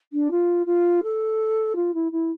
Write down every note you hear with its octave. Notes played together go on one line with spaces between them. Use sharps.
D4
F4
F4
A4
F4
E4
E4